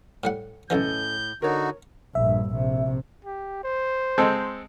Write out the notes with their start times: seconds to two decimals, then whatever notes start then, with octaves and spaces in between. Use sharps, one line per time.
0.24 A2 G3 F#5
0.70 B1 A2 C#3 E3 C#4 A4 D#5 G6
1.42 D3 D#4 F#4 A#4 C#5
2.15 A#1 G2 E5
2.52 A#1 C3
3.25 G4
3.64 C5
4.18 G#3 C4 A4